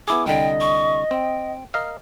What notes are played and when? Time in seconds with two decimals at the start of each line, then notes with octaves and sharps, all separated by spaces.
0.08 B3 E4 G#4 D6
0.26 C2 D3 D#5 G5
0.61 C#6
1.11 C4 G5
1.74 A#4 D#5 F5 F6